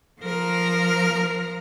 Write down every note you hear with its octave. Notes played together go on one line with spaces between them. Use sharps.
F3 A#4